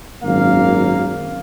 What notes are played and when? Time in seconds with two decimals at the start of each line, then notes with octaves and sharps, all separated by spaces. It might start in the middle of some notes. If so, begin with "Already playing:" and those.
0.23 G#1 F#2 A#3 F5